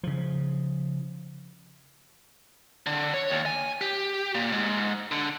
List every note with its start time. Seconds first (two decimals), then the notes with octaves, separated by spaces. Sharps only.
0.03 C#3 F3
2.86 D3
3.14 C#5
3.30 D#2
3.46 G#5
3.81 G4
4.35 A#2
4.52 G#2
5.11 D3